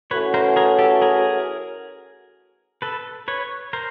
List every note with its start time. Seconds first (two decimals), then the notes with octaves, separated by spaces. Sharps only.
0.11 E3 A3 C#4 F#4 B4 C#5
0.34 A#4 C5
0.56 G#4 A#4
0.79 G4 A4
1.02 G#4 A#4
2.82 A4 B4
3.28 B4 C#5
3.73 A#4 C5